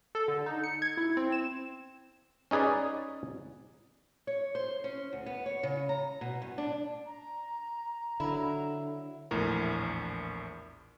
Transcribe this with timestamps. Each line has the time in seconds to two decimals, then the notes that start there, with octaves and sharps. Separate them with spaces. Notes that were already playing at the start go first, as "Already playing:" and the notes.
0.15 A4
0.28 D3
0.46 D#4
0.64 C#7
0.82 G#6
0.97 E4
1.17 C4
1.32 E7
2.51 C#4 D#4 G#4 B4 D5
4.27 C#5
4.55 C5
4.84 C#4
5.13 D2
5.26 B3
5.46 C#5
5.63 C#3
5.89 A#5
6.21 B2
6.42 G2
6.58 D4
7.06 A#5
8.20 D3 F#3 E4
9.31 A#1 E2 A2 A#4